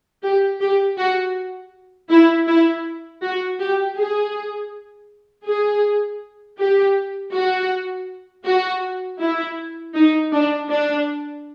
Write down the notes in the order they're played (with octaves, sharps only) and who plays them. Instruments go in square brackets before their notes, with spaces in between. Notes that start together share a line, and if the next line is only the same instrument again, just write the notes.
[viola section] G4
G4
F#4
E4
E4
F#4
G4
G#4
G#4
G4
F#4
F#4
E4
D#4
D4
D4